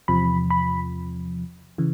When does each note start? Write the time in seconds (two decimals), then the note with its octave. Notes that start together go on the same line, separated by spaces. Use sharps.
0.08 E2 C3 F3 B5
0.50 B5
1.78 C#3 E3